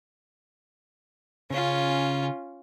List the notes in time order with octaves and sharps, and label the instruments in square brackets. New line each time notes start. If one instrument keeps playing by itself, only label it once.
[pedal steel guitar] C#3 [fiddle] C#4 F4